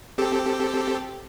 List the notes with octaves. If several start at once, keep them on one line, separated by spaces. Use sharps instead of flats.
C4 G4 A4